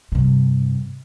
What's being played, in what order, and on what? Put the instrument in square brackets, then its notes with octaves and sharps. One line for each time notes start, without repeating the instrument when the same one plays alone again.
[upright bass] G2 C3